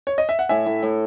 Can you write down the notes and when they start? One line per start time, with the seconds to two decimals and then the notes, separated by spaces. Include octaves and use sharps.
0.07 C#5
0.18 D#5
0.29 E5
0.39 F#5
0.49 A2 E5 G#5
0.66 A2
0.83 A2